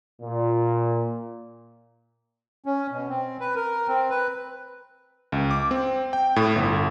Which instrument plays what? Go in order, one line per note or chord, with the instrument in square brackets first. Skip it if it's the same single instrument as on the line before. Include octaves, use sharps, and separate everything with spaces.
[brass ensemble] A#2
[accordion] C#4
B2
C4
B4
A#4
C4
B4
[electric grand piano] C#2
D6
C4
G5
A2
G1